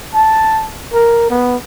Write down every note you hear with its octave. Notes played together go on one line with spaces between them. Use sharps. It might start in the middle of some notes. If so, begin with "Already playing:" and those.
A5
A#4
B3